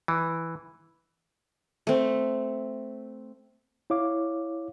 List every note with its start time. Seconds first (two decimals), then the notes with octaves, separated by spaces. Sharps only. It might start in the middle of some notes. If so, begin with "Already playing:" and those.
0.08 E3
1.87 A3 C4
3.90 E4 C#5 F5 D6